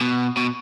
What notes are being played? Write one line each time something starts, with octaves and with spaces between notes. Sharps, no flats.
B2
B2